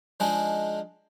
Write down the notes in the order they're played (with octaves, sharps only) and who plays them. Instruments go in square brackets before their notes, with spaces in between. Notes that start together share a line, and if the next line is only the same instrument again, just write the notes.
[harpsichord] F3 G#3 D4 D#4 G#4